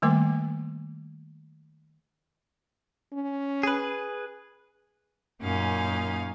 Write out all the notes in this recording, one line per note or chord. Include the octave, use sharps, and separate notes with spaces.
D#3 G3 A3 A#3 A#4 D6
C#4
G#4 B4
F#2 A#2 C#4 D#4 F5 G#5